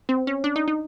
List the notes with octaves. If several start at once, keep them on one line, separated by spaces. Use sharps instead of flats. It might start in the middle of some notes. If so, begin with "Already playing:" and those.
C4
C#4
D4
D#4
D#4